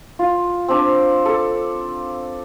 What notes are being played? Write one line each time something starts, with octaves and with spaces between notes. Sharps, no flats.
F4
C4 D4
A4